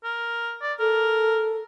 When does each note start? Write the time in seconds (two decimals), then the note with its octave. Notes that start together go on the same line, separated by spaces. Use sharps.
0.04 A#4
0.62 D5
0.80 A4 A#4